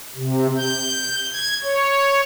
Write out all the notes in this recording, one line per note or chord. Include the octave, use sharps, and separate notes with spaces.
C3
G6
G#6
C#5